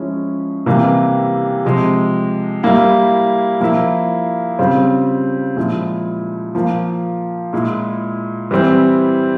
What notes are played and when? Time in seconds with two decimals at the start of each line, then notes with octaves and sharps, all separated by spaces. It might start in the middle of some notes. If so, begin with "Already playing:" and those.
Already playing: F3 G#3 C#4 E4
0.66 C3 E3 G3 A#3
1.65 C3 F3 G#3
2.63 G3 A#3 E4
3.60 F3 A#3 E4
4.59 C#3 G3 C4 F4
5.56 A#2 F3 G#3 E4
6.55 F3 A#3 F4
7.53 A#2 G#3 E4
8.51 E3 G3 C4 E4